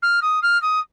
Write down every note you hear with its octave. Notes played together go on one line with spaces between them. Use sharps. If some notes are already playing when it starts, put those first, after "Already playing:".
F6
D#6
F6
D#6